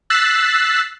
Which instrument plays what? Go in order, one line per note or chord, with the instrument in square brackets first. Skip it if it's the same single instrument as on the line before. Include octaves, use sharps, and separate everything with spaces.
[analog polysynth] E6 F#6 A6 B6 C7